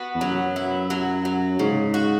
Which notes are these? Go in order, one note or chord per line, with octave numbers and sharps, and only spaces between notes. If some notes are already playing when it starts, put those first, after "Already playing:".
Already playing: B3 F#4
E2
F#2 F#3
E4
F#3
F#3
G#2 C#3
F#4